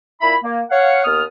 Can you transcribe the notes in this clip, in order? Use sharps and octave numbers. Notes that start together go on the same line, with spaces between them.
A#2 E4 E5 B5
A#3
C#5 F5 F#5
D#2 B3 D#6 F6